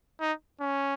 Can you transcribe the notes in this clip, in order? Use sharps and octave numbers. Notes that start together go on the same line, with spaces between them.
D#4
C#4